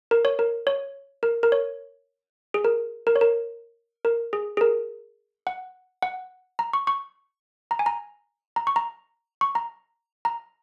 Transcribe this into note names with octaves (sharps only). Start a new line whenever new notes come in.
A#4
C#5
A#4
C#5
A#4
A#4
C#5
G#4
A#4
A#4
C#5
A#4
A#4
G#4
G#4
A#4
F#5
F#5
A#5
C#6
C#6
A#5
G#5
A#5
A#5
C#6
A#5
C#6
A#5
A#5